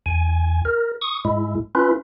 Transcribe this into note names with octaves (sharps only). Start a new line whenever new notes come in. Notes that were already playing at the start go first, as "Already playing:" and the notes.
E2 G#5
A#4
C#6 D#6
G#2 G#3 E4
C#4 E4 F4 B4